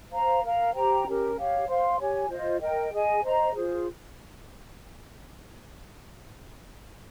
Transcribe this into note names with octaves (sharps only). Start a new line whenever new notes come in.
C5 F5 A#5
A#4 F5 A#5
G4 C5 G5 A#5
C#4 G4 A#4
G4 C#5 F5
C5 F5 C6
G4 C#5 G#5
F4 C5 D#5
A#4 D#5 G5
G#4 D#5 G#5
C5 D#5 A#5
F4 G#4 C5